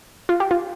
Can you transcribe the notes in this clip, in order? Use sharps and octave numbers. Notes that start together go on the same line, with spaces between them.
F4
G4
F4